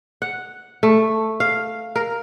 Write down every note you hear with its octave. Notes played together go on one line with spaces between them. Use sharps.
F#5
A3
F5
A#4